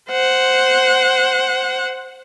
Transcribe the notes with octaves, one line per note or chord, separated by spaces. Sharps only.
C5 F#5